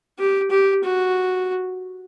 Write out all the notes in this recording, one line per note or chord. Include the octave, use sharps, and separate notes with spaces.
G4
G4
F#4